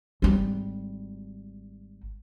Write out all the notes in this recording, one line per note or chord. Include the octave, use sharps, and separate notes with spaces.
G#1 G3